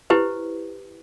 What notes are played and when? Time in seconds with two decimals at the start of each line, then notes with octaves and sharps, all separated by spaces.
0.10 E4 G4 B4 C5